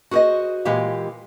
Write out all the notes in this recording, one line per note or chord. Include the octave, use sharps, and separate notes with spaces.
F#4 G#4 A#4 C5 D#5
A#2 E3 G#3 G4 F5